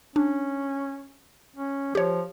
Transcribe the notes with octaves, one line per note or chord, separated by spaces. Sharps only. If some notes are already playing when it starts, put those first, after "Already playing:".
C#4 D4
C#4
F3 G4 C#5